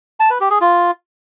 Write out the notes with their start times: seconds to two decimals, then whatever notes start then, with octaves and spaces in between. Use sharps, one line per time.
0.20 A5
0.30 B4
0.40 G4
0.51 G#4
0.61 F4